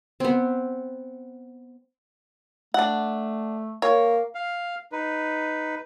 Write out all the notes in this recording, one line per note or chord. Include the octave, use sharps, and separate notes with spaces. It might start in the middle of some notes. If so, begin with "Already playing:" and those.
B3 C4
A3 D4 F#5
A#3 C#5
F5
D#4 B4